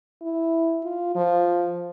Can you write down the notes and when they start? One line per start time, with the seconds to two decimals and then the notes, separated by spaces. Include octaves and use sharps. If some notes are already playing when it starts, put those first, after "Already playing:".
0.21 E4
0.83 F4
1.15 F3